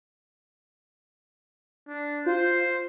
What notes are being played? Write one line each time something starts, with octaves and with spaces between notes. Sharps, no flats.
D4
F4 C5